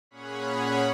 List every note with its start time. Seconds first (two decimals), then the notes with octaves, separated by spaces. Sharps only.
0.11 A#2 C#4 G#4 C#5 F#5 B5